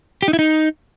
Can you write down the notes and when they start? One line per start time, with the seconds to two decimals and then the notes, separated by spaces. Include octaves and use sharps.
0.23 G4
0.28 D#4
0.33 E4
0.39 D#4